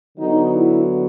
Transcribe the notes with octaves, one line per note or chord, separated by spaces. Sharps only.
D3 F#3 B3 D#4
E4